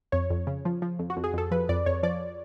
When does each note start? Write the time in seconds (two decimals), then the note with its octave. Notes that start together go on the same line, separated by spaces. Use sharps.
0.12 F2 C#5
0.30 F2
0.47 C#3
0.65 F3
0.82 F3
0.99 F2
1.10 F#4
1.17 F2
1.24 G#4
1.33 F2 A4
1.51 F3 B4
1.69 F2 D5
1.86 F2 C#5
2.03 F3 D5